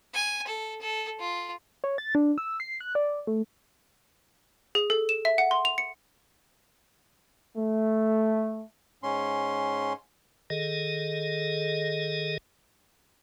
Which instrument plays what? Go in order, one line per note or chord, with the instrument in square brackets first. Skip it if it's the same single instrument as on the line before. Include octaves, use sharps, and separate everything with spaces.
[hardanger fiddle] G#5
A4
A4
F4
[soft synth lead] C#5
A6
D4
E6
C7
F#6
D5
A3
[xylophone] G#4
A4
E7
E5
F#5
C6
F7
C#7
[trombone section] A3
[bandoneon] G#2 C#4 C6
[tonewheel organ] D#3 G#4 A4 D#5